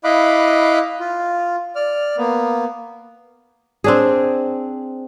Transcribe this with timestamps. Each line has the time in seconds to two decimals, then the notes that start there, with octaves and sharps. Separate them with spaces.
0.04 E4 D#5 F5 B5 D6 F#6
1.00 F4
1.76 D5 F6
2.18 A#3 B3
3.84 C4 D4 G#4